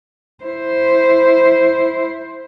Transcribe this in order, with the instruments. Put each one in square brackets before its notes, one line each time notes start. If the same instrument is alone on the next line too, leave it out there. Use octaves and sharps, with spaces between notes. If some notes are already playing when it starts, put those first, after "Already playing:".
[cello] E4 C5